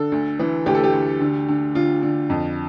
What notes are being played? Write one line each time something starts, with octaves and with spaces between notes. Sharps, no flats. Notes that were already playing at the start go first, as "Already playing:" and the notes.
Already playing: D3 A4
D2
E3
D2 G4
A4
G4
D2
D3
D3
D3 F4
D3
F2